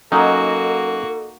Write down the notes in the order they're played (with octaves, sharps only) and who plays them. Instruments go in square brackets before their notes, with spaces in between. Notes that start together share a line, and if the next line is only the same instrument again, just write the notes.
[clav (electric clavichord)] F#3 C#4 [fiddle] A#3 F#4 [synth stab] D#4 [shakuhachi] A4